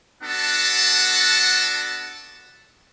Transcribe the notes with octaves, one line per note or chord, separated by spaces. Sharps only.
B3 D4 F#4 A4 F#5 A5